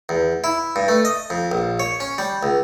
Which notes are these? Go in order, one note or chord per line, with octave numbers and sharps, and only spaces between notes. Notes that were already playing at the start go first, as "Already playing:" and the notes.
E2
E4
G2
A3
D#5
F2
A#1
C#5
C#4
G3
C#2